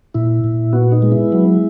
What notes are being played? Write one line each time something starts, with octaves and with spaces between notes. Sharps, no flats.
A#2 E4
A#2
B3 F#4
D#4
G#3
E4
F#3